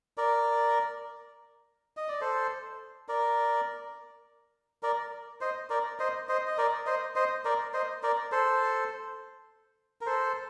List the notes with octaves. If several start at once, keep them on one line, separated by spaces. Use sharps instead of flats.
A#4 D5
D#5
D5
A4 C5
A#4 D5
A#4 D5
C5 D#5
A#4 D5
C5 D#5
C5 D#5
D#5
A#4 D5
C5 D#5
C5 D#5
A#4 D5
C5 D#5
A#4 D5
A4 C5
A#4
A4 C5